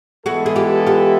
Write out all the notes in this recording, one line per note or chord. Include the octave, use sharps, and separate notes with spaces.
E3 G#3 B3 E4 F#4 G#4 A4
G#4
F4 G4
F4 G4